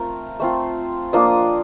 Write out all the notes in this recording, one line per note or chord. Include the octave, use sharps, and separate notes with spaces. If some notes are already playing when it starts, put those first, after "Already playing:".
Already playing: A3 C4 F4 A#4
A3 C4 F4
F3 A#3 D4 F4 D#5